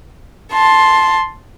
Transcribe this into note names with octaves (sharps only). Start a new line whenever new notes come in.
A5 C6